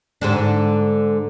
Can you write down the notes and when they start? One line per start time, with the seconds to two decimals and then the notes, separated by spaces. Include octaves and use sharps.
0.21 G#2 D3 D4